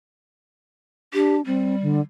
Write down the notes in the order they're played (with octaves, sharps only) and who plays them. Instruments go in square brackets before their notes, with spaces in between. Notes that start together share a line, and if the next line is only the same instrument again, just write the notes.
[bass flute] D4 [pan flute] G4
[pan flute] G3 [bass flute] C4
[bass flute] D3